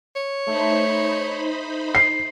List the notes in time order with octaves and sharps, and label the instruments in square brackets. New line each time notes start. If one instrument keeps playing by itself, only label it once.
[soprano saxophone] C#5
[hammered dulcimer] A3 E5 [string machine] D#4 C5 B5
[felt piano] C7